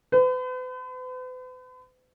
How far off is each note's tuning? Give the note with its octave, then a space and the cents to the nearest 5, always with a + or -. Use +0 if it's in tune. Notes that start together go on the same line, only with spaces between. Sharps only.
B4 +45